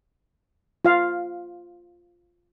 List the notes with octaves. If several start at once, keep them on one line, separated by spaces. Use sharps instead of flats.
F4 F5